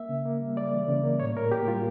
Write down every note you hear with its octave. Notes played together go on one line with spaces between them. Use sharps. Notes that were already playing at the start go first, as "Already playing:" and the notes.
Already playing: A#3 E5
C#3
A#3
G3
G3 D5
E3
C#3
A#3
A2 C#5
A2 A#4
A#3 G4
G3 F4